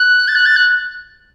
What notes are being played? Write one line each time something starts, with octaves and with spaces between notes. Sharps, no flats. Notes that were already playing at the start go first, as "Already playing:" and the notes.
Already playing: F#6
A6
F#6
A6
F#6